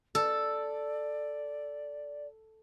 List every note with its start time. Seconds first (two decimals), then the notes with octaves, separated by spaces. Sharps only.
0.15 A4 D5